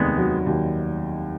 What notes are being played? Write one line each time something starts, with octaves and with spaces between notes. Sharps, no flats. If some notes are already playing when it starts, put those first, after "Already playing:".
Already playing: F1 D#2 D#3 G#3 B3
F#3
D#2